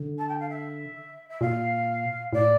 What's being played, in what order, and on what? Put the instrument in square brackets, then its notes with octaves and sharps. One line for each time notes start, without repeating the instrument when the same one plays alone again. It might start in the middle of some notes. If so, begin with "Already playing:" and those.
Already playing: [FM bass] D3
[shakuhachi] A5
G5
F5
E5
E5
[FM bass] A#2 [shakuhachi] F5
[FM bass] A2 [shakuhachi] D5